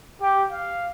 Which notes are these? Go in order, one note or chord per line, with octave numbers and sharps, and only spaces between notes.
G4
F5